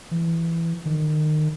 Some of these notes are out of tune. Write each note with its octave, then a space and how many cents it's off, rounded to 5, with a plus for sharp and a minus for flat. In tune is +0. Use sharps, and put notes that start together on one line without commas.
E3 +15
D#3 -25